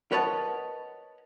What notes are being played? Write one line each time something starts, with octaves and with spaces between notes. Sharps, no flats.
A#4 B4 C#5 D#5 F#5 A5